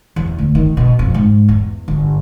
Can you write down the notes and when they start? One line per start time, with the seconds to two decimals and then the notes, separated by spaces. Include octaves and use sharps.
0.16 E2
0.38 D2
0.55 D#3
0.77 B2
0.99 F2
1.14 G#2
1.48 E2
1.88 G1